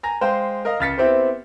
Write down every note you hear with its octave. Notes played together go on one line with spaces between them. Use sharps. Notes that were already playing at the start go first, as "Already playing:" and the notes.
G#5 A#5 A#6
G#3 C5 F5 G5
A#4 D#5 F5
C#2 F6 A6 B6 C#7
B3 C4 E4 G4 C5